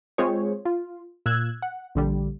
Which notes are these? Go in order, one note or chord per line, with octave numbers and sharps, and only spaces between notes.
G#3 C4 F4 G#4 C5 C#5
F4
A#2 E6 F#6 G#6
F#5
A#1 D3 G3